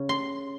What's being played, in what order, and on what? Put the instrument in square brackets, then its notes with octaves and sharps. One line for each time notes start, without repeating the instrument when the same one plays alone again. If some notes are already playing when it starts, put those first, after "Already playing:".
Already playing: [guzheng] C#3 C#4
C6